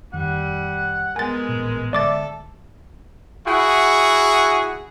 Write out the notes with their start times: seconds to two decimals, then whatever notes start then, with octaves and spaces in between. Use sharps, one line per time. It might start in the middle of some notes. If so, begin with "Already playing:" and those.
0.13 F2 D#3 G3 F#5
1.16 G#3 B3 A#4 G#5 A6
1.49 A1 A#2
1.93 D3 G#3 A4 D5 E5 D6 A6
3.47 E4 F#4 G#4 F#5